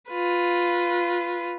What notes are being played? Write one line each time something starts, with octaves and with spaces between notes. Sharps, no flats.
F4 B4